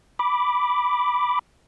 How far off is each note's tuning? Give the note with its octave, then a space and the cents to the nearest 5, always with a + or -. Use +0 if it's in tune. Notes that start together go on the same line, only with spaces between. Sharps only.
B5 +0 D6 +0